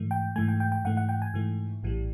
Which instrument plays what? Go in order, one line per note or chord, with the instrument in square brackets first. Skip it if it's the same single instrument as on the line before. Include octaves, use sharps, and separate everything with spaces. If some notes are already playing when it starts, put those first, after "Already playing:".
Already playing: [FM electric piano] G#2 E3 A3
G5
G#2 E3 A3 G#5
G5
G5
G5
G#2 E3 A3 F#5
F#5
G5
G#5
G#2 E3 A3
A#1 A2 E3 G3